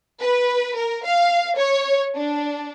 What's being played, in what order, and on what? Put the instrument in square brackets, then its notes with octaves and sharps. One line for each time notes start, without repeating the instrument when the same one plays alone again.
[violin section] B4
A#4
F5
C#5
D4